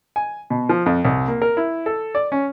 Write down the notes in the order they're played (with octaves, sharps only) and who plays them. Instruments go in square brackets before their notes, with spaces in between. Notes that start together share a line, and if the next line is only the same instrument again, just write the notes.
[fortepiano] G#5
B2
F3
F2
C2
A#3
A#4
E4
A4
D5
C#4